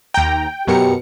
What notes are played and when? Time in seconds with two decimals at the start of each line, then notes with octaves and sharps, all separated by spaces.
0.14 D#2 G5 A#5
0.68 F#2 B2 G4 A#4 C#7